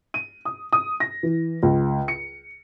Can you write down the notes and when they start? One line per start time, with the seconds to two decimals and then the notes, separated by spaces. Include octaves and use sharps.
0.14 D#7
0.45 D#6
0.73 D#6
1.00 A#6
1.23 E3
1.63 C#2
2.08 C#7